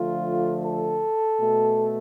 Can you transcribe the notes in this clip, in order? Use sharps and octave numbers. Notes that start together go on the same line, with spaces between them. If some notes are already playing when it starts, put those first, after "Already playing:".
Already playing: D3 F3 A3 F4
A4
B2 A3